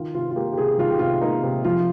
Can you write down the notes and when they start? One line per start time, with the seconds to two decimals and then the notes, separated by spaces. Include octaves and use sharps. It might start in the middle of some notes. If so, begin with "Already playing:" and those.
Already playing: D#3 F4
0.14 C3 F4
0.31 F4
0.36 A#3 G4
0.52 G4
0.57 C3 G#4
0.78 D#3 F4
0.90 G4
0.99 C3 F4
1.22 A#3 D#4
1.43 C3
1.64 F3 F4